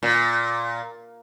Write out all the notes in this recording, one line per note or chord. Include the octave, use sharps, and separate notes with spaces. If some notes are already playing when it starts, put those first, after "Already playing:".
A#2